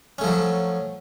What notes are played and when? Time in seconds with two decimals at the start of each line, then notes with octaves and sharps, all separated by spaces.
0.18 C#4
0.21 A3
0.24 F3
0.27 F#3